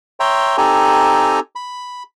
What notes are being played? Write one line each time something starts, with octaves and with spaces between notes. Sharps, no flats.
C#5 E5 G5 A#5 C6
C4 D#4 G4 A4 G#5 A#5
B5